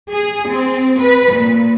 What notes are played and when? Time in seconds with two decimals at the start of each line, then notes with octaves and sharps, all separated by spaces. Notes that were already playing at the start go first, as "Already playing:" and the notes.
0.10 G#4
0.49 C4
1.00 B4
1.30 A#2